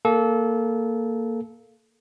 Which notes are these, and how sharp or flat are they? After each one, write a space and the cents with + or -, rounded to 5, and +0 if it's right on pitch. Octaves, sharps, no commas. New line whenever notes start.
A#3 -10 A4 -25